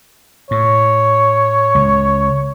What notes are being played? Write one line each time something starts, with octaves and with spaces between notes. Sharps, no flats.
A2 C#5
C#2